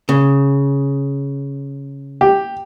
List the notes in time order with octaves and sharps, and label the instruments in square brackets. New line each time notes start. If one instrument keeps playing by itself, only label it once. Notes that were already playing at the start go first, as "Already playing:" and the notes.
[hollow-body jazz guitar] C#3
[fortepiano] G4